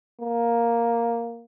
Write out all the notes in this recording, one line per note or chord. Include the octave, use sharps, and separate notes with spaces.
A#3